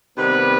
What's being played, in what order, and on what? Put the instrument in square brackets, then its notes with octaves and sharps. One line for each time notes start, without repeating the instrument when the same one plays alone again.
[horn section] C3 D#3 G3 B3 B4